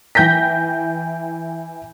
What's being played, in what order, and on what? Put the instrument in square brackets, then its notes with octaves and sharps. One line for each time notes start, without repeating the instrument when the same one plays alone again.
[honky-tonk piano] E3 G5 G6 A#6 B6